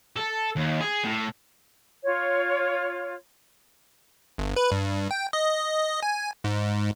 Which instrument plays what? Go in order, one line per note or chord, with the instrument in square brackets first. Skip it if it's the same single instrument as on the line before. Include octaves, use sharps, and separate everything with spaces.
[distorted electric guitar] A4
D#2
G#4
A2
[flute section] F4 C#5
[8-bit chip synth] G1
B4
G2
G5
D#5
G#5
G#2